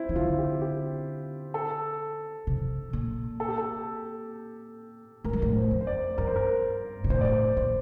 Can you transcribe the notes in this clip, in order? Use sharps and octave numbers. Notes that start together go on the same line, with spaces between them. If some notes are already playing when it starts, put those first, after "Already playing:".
Already playing: C4 E4
E3
D3 F4
G4
G4
A4
C3
A#2
A4
G4
A4
A2 A#4
G2
A2
C5
F2
C5
D5
G2 A#4
C5
A#4
A#2
A2 C5
D5
C5
A#2 C5